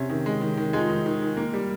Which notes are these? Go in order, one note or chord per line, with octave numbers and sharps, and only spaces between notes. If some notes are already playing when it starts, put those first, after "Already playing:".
Already playing: C3 C#4
D#3
G#3
D#3
D#3
G#3 D#4 F4
D#3
D#3
D#3
A#3
G3